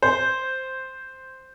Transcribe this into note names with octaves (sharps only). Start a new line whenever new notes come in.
C5